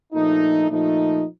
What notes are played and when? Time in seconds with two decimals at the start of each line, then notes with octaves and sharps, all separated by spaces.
0.13 A#1 A#2 F3 A3 D#4
0.68 A#2 F3 A3 D#4